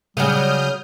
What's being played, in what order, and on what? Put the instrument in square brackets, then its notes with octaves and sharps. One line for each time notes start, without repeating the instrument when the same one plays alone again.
[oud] C#3 F#3 [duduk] G3 [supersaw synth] D#6 F6 G6